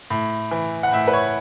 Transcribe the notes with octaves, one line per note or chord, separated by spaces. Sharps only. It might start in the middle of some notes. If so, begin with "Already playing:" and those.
A2
E3
F#5
A2 E5
B4
C#5